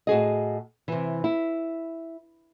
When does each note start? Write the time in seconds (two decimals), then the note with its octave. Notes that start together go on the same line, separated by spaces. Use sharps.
0.07 A2 F#4 G#4 D#5
0.88 C3 E3
1.24 E4